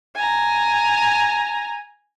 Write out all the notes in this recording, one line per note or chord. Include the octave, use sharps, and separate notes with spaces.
G#5 A#5